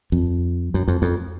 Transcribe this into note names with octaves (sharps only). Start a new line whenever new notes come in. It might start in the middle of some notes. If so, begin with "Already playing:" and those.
F2
F#2
F2
F2